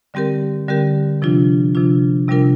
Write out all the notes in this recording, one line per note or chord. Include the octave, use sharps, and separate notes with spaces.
D3 G3 C4 G4 A#4
D3 G3 C4 G4 A#4
C3 F3 D4 F4
C3 F3 D4 F4
C3 G3 D4 F4 A#4